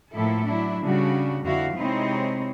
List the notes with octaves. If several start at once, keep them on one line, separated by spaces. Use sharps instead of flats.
A2 F3 A#3 E4 A4
F#3 D4 E4
C#3 G3 D4 F#4
F2 D3 E4 F#4 F5
C3 G#3 C4 D#4 E4 C#5